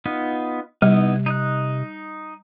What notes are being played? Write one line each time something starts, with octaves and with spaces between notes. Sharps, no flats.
B3 D#4 F4
C3 G3 B3 D#4 E4
D#4 D#5 F#6